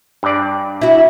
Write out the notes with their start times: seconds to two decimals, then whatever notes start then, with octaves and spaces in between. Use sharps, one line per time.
0.23 G2 D5
0.81 E4 F#4